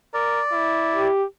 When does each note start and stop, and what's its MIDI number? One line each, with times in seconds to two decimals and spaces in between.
0.14 0.41 70
0.14 1.08 74
0.52 1.10 64
0.94 1.24 67